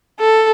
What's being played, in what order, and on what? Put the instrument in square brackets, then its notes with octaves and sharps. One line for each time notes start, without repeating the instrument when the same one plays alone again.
[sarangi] A4